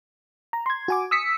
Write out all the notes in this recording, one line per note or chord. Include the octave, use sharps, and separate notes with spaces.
A#5
C6 G#6
F#4 G#5 D6
D#6 E6 B6 C#7